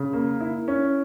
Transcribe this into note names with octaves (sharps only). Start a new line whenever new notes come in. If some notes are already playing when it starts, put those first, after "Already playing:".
Already playing: C#3
A#3
E4
C#4